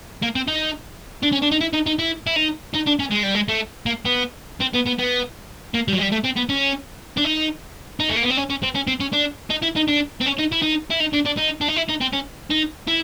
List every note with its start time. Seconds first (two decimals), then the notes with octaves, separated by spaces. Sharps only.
0.23 A#3
0.35 C4
0.48 D#4
1.23 D4
1.32 C#4
1.42 D4
1.52 D#4
1.61 E4
1.73 D#4
1.87 D#4
1.99 E4
2.27 E4
2.36 D#4
2.74 D#4
2.86 D4
2.99 C#4
3.11 G#3
3.23 G3
3.35 G#3
3.49 A3
3.86 A#3
4.05 B3
4.61 C4
4.75 B3
4.87 B3
4.99 B3
5.74 A#3
5.88 G3
5.93 F#3
5.98 G#3
6.02 G3
6.12 A3
6.25 C4
6.37 B3
6.49 C#4
7.17 D4
7.24 D#4
8.00 D#4
8.09 A3
8.16 A#3
8.23 B3
8.31 C4
8.37 C#4
8.50 C#4
8.63 C4
8.75 C#4
8.87 C4
9.00 C#4
9.13 D4
9.50 D#4
9.62 E4
9.76 D#4
9.88 D4
10.21 C4
10.26 C#4
10.38 D#4
10.52 E4
10.62 D#4
10.91 E4
11.00 D#4
11.14 D4
11.26 D4
11.38 D#4
11.61 D4
11.69 D#4
11.76 E4
11.89 D#4
12.01 C4
12.13 C#4
12.50 D#4
12.88 E4